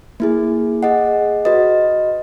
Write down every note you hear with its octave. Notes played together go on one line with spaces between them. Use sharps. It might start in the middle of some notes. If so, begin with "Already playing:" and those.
A#3 E4 G#4
G#4 D#5 F#5
F#4 B4 D#5